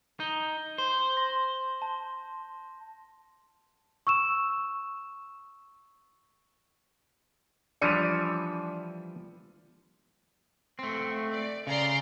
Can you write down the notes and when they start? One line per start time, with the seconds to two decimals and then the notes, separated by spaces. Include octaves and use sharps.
0.20 D#4 G6 G7
0.78 C5
1.17 C6 A#6
1.82 A5
4.07 C#6 E6 E7
7.82 E3 F3 G3 D4 C#7 D#7
10.79 A3 C4
11.32 D5
11.67 C#3 D5 A#5 C6